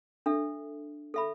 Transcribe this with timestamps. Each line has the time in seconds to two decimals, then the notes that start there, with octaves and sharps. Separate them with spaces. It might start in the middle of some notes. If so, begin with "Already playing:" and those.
0.26 D4 A4 E5
1.14 A4 E5 B5